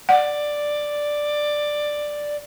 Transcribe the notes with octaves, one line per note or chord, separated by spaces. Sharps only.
D5 F#5